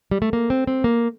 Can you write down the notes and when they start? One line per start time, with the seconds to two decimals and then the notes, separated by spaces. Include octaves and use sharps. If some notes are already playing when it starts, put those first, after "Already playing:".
0.11 G3
0.22 A3
0.33 A#3
0.50 C4
0.67 C4
0.84 A#3